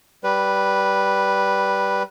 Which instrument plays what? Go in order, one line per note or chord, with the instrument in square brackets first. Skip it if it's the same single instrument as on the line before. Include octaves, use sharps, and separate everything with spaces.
[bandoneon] G3 B4